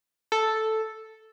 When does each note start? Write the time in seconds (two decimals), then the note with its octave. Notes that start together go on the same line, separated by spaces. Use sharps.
0.32 A4